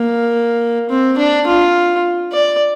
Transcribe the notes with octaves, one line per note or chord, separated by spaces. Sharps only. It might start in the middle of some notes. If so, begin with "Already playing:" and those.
Already playing: A#3
C4
D4
F4
D5